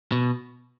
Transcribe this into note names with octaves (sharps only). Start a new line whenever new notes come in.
B2